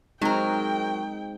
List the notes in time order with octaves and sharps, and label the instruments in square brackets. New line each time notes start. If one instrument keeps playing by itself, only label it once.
[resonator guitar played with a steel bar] F#3 A#4 [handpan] G#3 C4 D#4 [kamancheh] G5